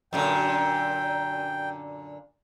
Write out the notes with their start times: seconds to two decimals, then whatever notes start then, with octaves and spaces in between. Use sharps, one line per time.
0.13 F#2 A#2 D3 G5